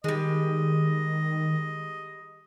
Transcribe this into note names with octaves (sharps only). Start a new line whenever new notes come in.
D#3 G3 G#3 D#5